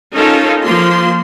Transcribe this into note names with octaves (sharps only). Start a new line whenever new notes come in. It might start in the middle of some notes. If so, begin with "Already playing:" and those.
C#4 D#4 F4 A4 A#4 F5
F3 A#3 F4 C6